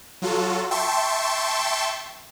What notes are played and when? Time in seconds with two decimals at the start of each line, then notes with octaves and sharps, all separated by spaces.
0.22 F#3 F4 F#4 A4
0.71 E5 G5 A5 C6 C#6